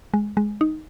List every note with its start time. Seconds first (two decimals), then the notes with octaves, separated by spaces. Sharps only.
0.14 G#3
0.37 G#3
0.61 D#4